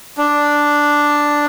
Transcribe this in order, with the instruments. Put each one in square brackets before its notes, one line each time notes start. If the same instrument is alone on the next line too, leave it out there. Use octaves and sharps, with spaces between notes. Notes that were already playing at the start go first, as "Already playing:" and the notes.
[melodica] D4